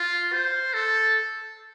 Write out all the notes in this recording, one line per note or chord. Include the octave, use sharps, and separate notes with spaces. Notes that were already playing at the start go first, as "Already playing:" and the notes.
Already playing: F4
C5
A4